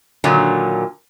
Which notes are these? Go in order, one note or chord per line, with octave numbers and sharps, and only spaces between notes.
A#2 D3 D#3 F#3